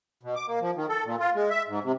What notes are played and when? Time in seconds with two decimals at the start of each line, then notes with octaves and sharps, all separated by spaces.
0.23 B2
0.36 D6
0.48 A#3
0.61 F3
0.76 D#3
0.89 A4
1.05 A#2
1.20 F4
1.35 G#3
1.50 E5
1.68 G#2
1.84 C3